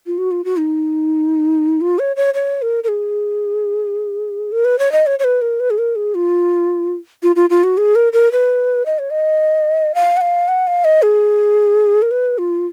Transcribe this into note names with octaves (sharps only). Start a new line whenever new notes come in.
F4
F#4
F4
F#4
D#4
F4
C#5
C#5
C#5
A#4
A#4
G#4
A#4
B4
C#5
D#5
C#5
C#5
B4
A#4
B4
G#4
A#4
G#4
F4
F4
F4
F4
F#4
G#4
A#4
A#4
B4
D#5
C#5
D#5
F5
F#5
F5
F#5
F5
D#5
G#4
A#4
B4
F4